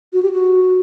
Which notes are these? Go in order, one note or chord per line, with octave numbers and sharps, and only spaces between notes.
F#4
G4
F#4